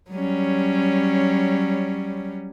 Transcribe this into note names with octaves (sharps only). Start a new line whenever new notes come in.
F#3 G3 C#4